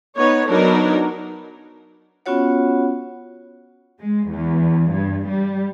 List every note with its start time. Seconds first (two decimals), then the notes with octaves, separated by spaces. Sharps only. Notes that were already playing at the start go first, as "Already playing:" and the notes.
0.16 B3 D#4 C#5
0.47 F#3 B3 D4 D#4 A#4
2.26 B3 C#4 F4 F#4 C#5 F#5
4.01 G#3
4.30 E2
4.94 G2
5.29 G3